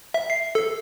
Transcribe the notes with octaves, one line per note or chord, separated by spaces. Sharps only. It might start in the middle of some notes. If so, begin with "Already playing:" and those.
E5
C7
A4